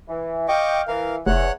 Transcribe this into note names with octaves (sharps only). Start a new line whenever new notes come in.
E3
D#5 F5 G5 C#6 D6
E3 A#4 F5
F1 E2 C#5 F#5 F#6